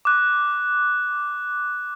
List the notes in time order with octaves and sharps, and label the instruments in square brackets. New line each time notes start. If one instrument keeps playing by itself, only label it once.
[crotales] D6 F#6